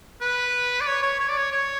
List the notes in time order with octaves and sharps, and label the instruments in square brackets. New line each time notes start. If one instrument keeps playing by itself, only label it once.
[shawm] B4
D5
C#5
C#5
C#5
D5
C#5
C#5